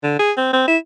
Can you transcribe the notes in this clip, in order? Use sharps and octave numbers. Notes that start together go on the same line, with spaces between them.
D3
G#4
C4
C4
E4